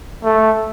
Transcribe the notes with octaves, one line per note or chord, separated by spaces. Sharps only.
A3